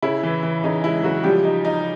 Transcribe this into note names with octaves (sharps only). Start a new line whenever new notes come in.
C#3 E4
E3
E3
C#3 D#4
G#3 E4
C#3 F#3 F#4
F3 G3 G4
D#4
D#4